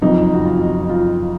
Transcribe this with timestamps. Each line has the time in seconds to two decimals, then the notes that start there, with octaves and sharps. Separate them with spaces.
0.02 F#1 F2 F3 D#4
0.34 F#4
0.45 F4
0.89 F4